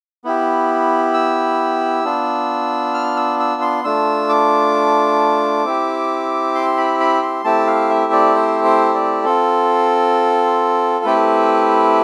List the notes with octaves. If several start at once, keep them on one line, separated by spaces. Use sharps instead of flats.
B3 E4 G4
E6
B3 D4 F4
F6
E6
E6
C6
A3 D4 F4 E6
D6
C4 E4 G4
C6
B5
B5
C6
A3 C4 E4 G4 A5
F5
E5
D5
C5
C5
D5
C4 F4 A4
A3 C4 E4 G4 B4